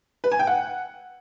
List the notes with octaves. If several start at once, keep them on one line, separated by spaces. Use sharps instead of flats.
B4
G#5
G5
F#5